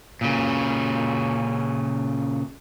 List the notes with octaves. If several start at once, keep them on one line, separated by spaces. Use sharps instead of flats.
A#2 C#3